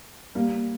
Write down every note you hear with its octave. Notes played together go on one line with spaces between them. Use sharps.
G3 A#3